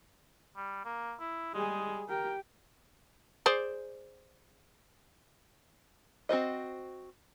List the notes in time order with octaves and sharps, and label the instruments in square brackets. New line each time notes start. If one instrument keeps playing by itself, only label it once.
[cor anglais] G3
A#3
E4
[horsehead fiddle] G3 G#4 [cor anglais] G#3
[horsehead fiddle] G4 G5 [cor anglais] A#4
[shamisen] G#4 C5 D5
[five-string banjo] C4 F#4 C5 D#5